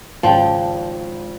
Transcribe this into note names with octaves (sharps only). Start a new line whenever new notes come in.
G#1 C#3 F3 G5 A5